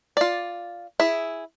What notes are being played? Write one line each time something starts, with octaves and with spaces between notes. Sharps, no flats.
F4 D5
E4 G#4